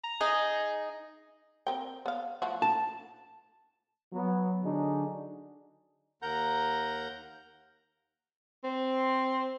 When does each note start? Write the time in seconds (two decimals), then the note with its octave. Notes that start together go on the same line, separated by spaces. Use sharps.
0.04 A#5
0.21 D#4 G#4 D#5
1.67 C4 A#4 G5
2.06 B3 F5
2.42 F3 A3 F#4
2.62 A5
4.13 F#3 B3
4.63 D3 F#3 D4 D#4 F#4 G#4
6.22 D#2 A#4 F#5 A#5 G6
8.64 C4